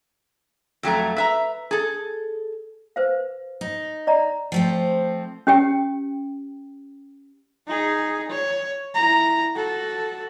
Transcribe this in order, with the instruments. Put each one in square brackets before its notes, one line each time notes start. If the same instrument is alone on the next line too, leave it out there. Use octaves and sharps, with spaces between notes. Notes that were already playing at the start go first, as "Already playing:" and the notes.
[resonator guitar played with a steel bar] F2 F#3 A3 A#5
B4 E5 A#5
G#4 A4
[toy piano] B4 C5 F5
[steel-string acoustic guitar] D#4
[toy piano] D5 D#5 A#5
[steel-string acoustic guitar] F3 A3 C4
[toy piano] C#4 G4 G5
[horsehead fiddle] D#4 G#4
C#5
E4 A#5
F#4 A4